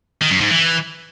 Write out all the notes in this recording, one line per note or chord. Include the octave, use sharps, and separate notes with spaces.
D#3
F#2
G#2
E3